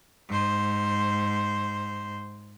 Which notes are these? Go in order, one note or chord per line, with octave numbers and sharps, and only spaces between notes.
G#2 C5